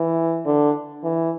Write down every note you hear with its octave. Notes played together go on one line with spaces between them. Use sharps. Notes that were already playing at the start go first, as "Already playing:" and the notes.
Already playing: E3
D3
E3